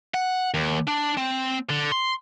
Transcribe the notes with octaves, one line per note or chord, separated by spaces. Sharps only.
F#5
D#2
D4
C4
D3
C6